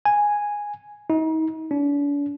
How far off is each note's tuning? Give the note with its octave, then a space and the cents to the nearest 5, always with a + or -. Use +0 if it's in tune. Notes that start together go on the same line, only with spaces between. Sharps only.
G#5 -5
D#4 +35
D4 -45